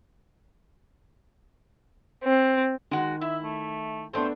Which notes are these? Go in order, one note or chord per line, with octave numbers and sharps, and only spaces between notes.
C4
D#3 G#3 F#4
E4 E5
A3
A3 B3 C4 D4 A4 C5